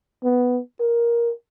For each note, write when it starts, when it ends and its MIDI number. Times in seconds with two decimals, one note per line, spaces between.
0.24 0.60 59
0.80 1.31 70